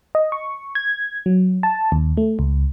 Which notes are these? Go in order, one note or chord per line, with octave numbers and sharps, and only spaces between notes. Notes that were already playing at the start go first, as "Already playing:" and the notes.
D#5
C#6
G#6
F#3
A5
D#2
A3
C#2